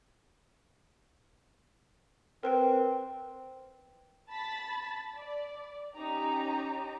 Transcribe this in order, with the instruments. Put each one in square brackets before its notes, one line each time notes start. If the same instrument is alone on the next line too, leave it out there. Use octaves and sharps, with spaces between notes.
[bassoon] C4 [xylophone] A#4 B4 G5
[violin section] A5 B5 A6 B6
D5
C#4 D#4 G4 A#5